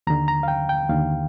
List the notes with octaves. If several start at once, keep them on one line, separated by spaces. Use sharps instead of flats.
D#2 D3 A#5
A#5
F5
G5
G5
D#2 D3 F5